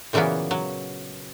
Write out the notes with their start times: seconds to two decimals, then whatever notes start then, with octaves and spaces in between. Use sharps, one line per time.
0.13 A#2 C#3 E3 F#3 A#3 B3
0.51 F#3